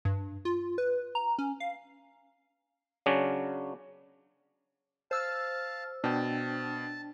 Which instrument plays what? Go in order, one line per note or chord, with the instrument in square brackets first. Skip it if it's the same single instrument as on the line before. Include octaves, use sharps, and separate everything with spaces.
[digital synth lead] G2
F4
B4
A#5
C#4
F5
[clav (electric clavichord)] C#3 F#3 C#4 D4
[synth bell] C5 E6 F6 [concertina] F5 A5
[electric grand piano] B2 [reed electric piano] D4 G5 [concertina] A5